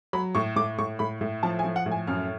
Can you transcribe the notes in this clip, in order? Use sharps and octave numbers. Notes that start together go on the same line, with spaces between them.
F#3 B5
A2 C#6
A2 D6
A2 C#6
A2 B5
A2
F3 A5
G#5
F3
F#5
A2
G#5
F#2 F6